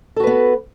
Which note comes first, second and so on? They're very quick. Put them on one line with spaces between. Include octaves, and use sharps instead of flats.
A4 F#4 B4 B3